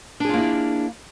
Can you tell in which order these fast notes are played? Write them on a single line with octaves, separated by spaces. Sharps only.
D4 G#4 F4 A#3 E4